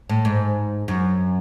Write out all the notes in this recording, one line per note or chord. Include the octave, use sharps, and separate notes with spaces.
A2
G#2
F#2